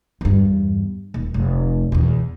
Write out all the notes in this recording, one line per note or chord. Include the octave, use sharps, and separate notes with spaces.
E2 G2
D#1
F1
E2 B2